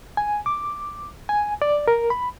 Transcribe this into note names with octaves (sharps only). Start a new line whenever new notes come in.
G#5
D6
G#5
D5
A#4
B5